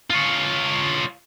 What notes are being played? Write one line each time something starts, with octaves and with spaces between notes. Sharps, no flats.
F4 C#5